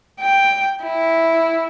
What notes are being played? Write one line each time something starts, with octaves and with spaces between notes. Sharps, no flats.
G5
E4